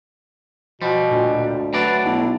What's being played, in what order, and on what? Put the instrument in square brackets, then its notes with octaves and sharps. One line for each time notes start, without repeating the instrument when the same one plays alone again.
[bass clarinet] B2 [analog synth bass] F3 [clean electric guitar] G3
[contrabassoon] D2 [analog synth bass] A#2
[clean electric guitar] F#3 D4 D5 [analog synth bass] A3 [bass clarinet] B4
[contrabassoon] B1 [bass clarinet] E4